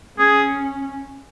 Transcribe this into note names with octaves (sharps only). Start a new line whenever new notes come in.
C#4 G#4